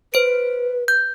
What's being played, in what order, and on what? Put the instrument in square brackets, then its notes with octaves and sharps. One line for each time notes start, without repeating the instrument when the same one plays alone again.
[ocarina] B4 [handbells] C5 D7
[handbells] G6